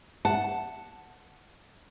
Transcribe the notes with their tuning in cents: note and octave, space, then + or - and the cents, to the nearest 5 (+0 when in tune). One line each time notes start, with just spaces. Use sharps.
F#5 +0 A5 +0